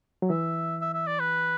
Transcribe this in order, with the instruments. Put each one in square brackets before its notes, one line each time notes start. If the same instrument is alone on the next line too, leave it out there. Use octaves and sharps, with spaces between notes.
[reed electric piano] F#3
[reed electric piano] E3 [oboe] E5
[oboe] E5
E5
D5
B4